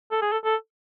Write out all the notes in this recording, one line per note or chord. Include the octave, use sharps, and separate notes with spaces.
A4
G#4
A4
A4